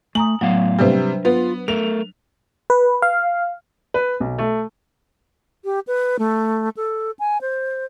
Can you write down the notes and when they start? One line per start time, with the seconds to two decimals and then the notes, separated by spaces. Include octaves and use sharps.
0.15 A3 G#5 A#5 D#6 F#7
0.41 A2 F#3 B3 F5
0.79 C3 G3 D4 B4 C5
1.25 B3 F4
1.68 A3 A#4 F7
2.70 B4
3.02 F5
3.94 B4
4.20 B1
4.38 A3
5.64 G4
5.87 B4
6.19 A3
6.77 A4
7.19 G#5
7.41 C5